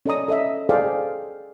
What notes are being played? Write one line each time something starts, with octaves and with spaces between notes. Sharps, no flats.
C#4 A4 D5 D#5 A#5 D#6
A4 D#5 E5
G#4 A4 C5 D5 F5 G5